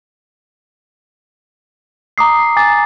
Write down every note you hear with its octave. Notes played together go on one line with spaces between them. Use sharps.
A#5 D6 D#6 C7
G#5 D6 A6